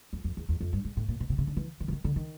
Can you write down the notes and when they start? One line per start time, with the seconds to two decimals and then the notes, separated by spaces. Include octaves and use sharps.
0.13 F2
0.24 F2
0.37 E2
0.49 E2
0.61 F2
0.73 G2
0.85 G#2
0.97 A2
1.08 A#2
1.20 B2
1.30 C3
1.38 C#3
1.47 D3
1.57 E3
1.80 D#3
1.88 E3
1.92 D#3
2.04 D3
2.16 D#3